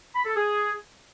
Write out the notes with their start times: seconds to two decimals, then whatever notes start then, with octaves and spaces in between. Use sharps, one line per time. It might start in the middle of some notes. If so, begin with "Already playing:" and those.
0.15 B5
0.25 A4
0.36 G#4